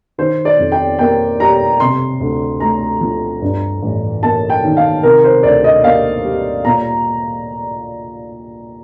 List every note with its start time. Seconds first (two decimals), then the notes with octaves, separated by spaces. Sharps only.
0.18 D#3 C5
0.45 D5
0.59 F2
0.72 G5
0.99 A#3 G5
1.40 G3 A#5
1.80 C3 C6
2.20 D2
2.60 A3 A#5
3.01 F3
3.42 G2
3.82 A1
4.23 A#3 A5
4.50 G5
4.63 D#3
4.77 F5
5.03 C3 A#4
5.24 C5
5.43 D2 D5
5.64 D#5
5.84 A#3 F5
6.24 G3
6.65 A#2 A#5